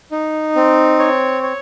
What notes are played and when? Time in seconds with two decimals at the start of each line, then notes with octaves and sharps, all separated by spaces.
0.12 D#4
0.56 C4
0.99 C#5
1.43 C#5